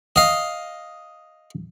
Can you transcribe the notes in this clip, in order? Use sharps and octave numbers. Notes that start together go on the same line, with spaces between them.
D#5 F5